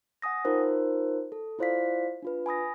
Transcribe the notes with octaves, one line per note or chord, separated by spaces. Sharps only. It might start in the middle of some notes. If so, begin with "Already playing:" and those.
F#5 G#5 D#6 A#6
D#4 F4 A#4 C5
A4
E4 F4 C5 D5 F5 B6
D4 F4 B4
G#5 B5 D#6 A#6